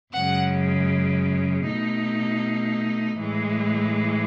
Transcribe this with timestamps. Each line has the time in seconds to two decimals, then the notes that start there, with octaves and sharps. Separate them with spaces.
0.13 F#2 C#3 G#3 F#5
1.65 B2 A3 D#4
3.18 A2 E3 G#3